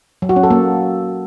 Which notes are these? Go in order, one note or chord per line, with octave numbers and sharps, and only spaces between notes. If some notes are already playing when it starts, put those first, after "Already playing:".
F#3
F#4
C#4
A4
A#3